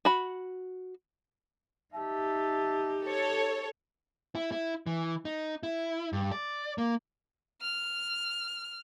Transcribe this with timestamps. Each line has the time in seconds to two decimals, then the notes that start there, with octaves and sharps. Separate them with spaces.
0.05 F#4 B5
1.94 D#4 G4 E5 A5
3.04 A4 C#5
4.35 E4
4.52 E4
4.87 E3
5.25 D#4
5.63 E4
6.13 G2
6.32 D5
6.78 A#3
7.62 F6